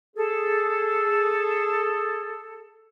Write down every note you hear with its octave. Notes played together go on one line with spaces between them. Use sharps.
G#4 A4